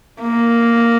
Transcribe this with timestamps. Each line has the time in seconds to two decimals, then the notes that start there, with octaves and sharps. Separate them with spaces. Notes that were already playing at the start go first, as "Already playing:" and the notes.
0.21 A#3